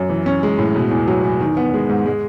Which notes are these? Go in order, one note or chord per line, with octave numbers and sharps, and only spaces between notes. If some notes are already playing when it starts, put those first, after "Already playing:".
Already playing: F#2
E3
C#4
G#3
A2
B2
E2
F#3
E2
D#3
B3
G#3
G#2
G#3